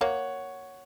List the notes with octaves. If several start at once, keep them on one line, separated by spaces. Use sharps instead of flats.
A#3 C#5 F#5